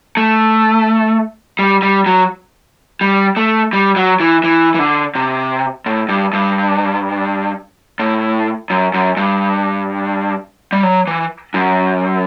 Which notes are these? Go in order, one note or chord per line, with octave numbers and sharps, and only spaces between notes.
A3
G3
G3
F#3
G3
A3
G3
F#3
E3
E3
E3
D3
C3
A2
G2
G2
A2
F#2
F#2
G2
G3
F#3
E3
F#2